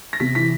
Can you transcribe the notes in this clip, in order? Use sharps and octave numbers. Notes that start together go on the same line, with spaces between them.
A#6
C3 B6
E3 B6